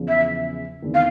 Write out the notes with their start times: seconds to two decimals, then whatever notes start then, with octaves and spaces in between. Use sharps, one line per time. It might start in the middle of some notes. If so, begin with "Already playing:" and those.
Already playing: E2 C#3 F3
0.08 E5
0.82 E2 C3 D#3
0.94 F5